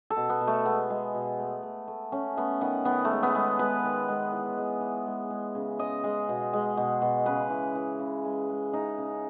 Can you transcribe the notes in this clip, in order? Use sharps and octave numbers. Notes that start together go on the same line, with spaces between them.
A4
B2
B3
B2
A3
G#3 B3
G#3
B2
A3
A3
A3
A3 C#4
A3 B3
D#3 B3
D#3 B3
A3
G#3
B3
G#3
G#3 B4
D#3
G#3
E3
G#3
E3
G#3
G#3
C#3
G#3 D#5
G#3
B2
G#3
B2
B2
C#3 B4
E3
E3
C#3
G#3
G#3
G#3 D#4
C#3